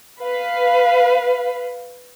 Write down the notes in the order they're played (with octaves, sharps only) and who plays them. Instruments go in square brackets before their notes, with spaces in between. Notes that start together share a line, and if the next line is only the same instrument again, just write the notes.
[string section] B4 F5